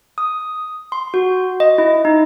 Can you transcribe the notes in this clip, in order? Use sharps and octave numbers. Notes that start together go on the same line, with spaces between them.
D#6
C6
F#4
D#5
E4
D#4